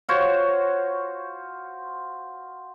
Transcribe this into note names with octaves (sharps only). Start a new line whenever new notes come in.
F4 F#4 C5 C#5